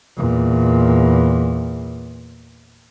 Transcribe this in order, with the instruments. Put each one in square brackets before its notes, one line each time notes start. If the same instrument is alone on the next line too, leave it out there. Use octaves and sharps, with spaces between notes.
[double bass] E2 A#2